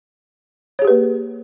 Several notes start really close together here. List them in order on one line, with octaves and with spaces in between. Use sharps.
C#5 G#4 G4 B4 A#3